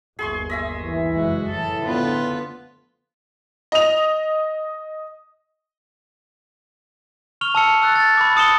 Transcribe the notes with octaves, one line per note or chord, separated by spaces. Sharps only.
G1 D#2 G#4 C6 C#6
D#5 E5 G#5
E3
F#1 F2 G#3 F#4
A2 E3 A4
D3 F3 B3 F4 B4
D#5 F7
C#6 F6 F7 G7
A5 E6 C#7
E6 F#6 A6
A6
B5 D6
A5 D#6 C#7 E7 G7